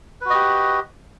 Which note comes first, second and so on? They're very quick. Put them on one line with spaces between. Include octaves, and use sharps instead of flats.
B4 F#4 D#5 G4